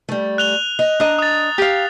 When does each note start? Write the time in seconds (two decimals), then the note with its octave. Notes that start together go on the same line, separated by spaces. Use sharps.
0.09 G3 A3
0.38 F#6 F7 G7
0.79 D#5
1.00 D4 D#5 A#5
1.19 D#6 A6
1.58 G4 F5